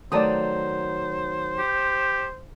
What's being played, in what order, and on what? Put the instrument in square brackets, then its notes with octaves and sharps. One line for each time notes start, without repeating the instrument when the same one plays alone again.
[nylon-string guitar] D#3 F#3 A3 [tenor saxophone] C5 [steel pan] D5 A5 D#6
[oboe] G4